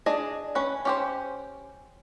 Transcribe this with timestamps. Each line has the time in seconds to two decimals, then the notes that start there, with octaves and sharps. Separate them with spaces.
0.06 D4 G#4 D#5
0.55 C#4 B4
0.85 C#4 G4 C5